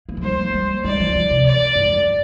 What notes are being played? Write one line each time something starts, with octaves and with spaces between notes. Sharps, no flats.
A#3
F3
G3 C5
A#3
G3
G3 D5
F3
D3
C3
D5
G2
F2